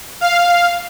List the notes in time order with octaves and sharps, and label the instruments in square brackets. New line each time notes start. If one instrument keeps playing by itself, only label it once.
[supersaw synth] F5